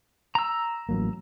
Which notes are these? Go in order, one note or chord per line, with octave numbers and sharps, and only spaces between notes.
A#5 E6
A1 F#3 A#3